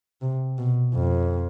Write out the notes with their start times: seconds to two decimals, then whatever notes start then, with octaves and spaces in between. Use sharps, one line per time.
0.22 C3
0.58 B2
0.95 F2